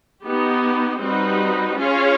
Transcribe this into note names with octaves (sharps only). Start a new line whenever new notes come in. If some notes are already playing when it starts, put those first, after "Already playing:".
B3 D#4 G4
G3 C4 D#4 F#4 B4
C#4 F4 G#4 C#5 F5